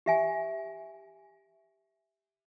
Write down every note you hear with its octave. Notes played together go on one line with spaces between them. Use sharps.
G4 E5 G#5